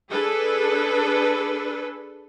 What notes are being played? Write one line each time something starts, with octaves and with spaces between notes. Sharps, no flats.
D4 G#4 A4 B4